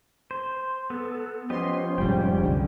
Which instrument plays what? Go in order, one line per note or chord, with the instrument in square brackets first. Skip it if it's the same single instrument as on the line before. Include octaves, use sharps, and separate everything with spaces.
[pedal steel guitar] C5
[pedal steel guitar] B3 [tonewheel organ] A4
[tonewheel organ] F3 C#4 [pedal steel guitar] B3 G4 D#5 [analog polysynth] C6
[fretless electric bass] F1 [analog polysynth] G#2 G3 [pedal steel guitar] G5
[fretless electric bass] C2 F#2 D3